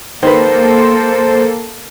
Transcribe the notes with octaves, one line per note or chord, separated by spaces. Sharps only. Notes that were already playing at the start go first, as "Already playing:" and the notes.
D#3 A#3 A4 B4 C5